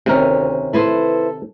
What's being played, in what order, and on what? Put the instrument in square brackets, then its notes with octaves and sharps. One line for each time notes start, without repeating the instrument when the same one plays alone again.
[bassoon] D2 [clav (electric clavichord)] C3 D#3 A#4 [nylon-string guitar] C4 C#4
[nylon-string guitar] E4 B4 C5 [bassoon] A4